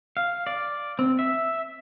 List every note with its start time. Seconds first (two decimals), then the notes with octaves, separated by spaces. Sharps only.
0.17 F5
0.47 D5
0.99 C4
1.19 E5